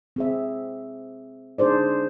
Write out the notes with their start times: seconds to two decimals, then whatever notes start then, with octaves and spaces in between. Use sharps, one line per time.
0.16 C4 G#4 E5
1.58 D4 D#4 G#4 C5 D5